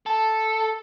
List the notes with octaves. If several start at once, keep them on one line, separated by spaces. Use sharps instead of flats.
A4